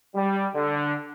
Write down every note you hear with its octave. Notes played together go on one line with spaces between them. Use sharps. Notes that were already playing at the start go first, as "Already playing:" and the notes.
G3
D3